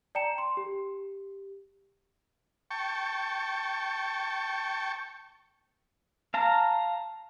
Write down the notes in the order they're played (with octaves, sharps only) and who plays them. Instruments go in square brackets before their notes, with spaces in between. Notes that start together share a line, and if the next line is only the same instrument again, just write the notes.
[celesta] D5 G5 A5 A#5 C#7 E7
C6
G4
[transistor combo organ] G5 A5 C#6
[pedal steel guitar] F5 A5 A#5